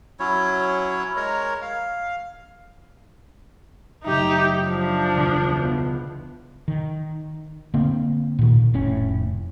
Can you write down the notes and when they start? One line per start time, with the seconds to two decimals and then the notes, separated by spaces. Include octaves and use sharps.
0.19 F#3 C#4 E4 C#5
1.17 G#3 A#4 C#5 A#5
1.62 F5
4.04 F#1 A3 D#4 G4 E5
4.66 F3 D4
5.14 E1 C#2
5.62 B3 F4
6.68 D#3
7.74 D3 A#3 C4
8.39 A#2 D#3
8.74 F1 A2 C#4